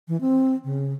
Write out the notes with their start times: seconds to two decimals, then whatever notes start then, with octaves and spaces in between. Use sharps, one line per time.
0.08 E3
0.21 C4
0.64 C#3